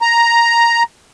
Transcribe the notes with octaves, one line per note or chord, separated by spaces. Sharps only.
A#5